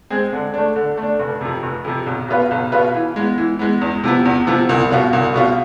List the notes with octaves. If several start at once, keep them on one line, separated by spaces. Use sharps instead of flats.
G#3 C4 G#4
D3
A3 D4
D3
A3 D4
F1
F2 C3
F1
F2 C3
B1
B2 B3 F4 B4
B1
B2 B3 F4 B4
E3
G#3 B3
E3
G#3 B3
E2
C3 F3 B3
E2
C3 F3 B3
C2
B2 B3 F4
C2
B2 B3 F4